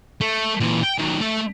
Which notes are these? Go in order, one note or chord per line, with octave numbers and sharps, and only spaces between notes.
A3
A#2 E3
G5
D#3 F#3
A3 E5